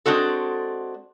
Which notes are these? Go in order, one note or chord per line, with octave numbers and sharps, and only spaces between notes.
G#3 C4 D4 F#4 A4